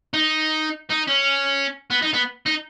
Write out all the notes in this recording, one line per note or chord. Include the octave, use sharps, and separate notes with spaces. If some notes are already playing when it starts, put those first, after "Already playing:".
D#4
D#4
C#4
B3
D#4
B3
D#4